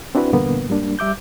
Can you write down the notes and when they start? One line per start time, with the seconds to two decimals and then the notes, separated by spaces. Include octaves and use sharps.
0.15 C4 D4 E4 F#4 B4
0.33 E2 G2 A#2 D3 A#3 B3
0.69 G#2 G3 A#3 D4
0.99 G3 E5 D6 G6